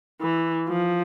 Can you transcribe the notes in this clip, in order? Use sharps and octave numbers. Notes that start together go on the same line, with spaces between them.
E3
F3